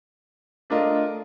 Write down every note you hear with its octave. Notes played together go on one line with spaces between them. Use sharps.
A3 D4 F4 A#4 D#5